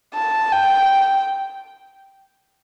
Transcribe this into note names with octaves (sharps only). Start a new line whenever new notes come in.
A5
G5